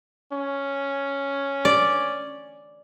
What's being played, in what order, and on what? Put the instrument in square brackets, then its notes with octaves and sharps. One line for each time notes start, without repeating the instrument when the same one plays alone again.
[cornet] C#4
[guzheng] D5